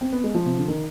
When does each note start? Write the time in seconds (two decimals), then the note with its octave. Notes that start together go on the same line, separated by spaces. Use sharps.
0.01 C4
0.12 B3
0.24 G#3
0.35 F3
0.46 C3
0.57 D3
0.68 D#3